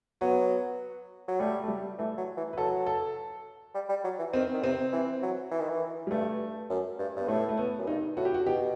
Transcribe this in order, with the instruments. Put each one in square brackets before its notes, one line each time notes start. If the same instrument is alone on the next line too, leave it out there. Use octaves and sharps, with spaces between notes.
[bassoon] F#3 [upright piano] B3
[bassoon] F#3
[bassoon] G3 [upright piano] A3
[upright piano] A3
G3
[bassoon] E3 [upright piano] A3
[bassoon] F#3
E3
[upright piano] B4
[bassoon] F#3 [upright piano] A4
[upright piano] A4
[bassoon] G3
G3
F#3
E3
[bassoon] D#3 [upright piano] C4
[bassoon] D#3
[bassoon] C3 [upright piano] C4
[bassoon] E3
F#3
E3
D#3
E3
[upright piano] G3
[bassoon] G2 [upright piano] A3
[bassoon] F#2
G2
[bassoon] G2 [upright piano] B3
[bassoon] A2 [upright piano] A3
[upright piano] A3
B3
[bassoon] F#2
[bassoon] G2 [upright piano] D#4
[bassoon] A2 [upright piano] F#4
[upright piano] G4
F#4
[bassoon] B2 [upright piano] G4